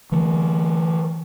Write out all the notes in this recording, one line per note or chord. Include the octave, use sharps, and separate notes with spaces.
D3 E3 A3